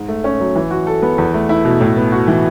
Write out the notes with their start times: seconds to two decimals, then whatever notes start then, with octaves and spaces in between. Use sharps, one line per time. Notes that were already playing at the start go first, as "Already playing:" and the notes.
Already playing: G#2
0.08 A3
0.24 C#4
0.40 F#3
0.55 E3
0.71 F#4
0.87 A4
1.02 B3
1.18 E2
1.34 A3
1.49 E4
1.65 B2
1.81 A2
1.97 B3
2.12 F#4
2.28 E3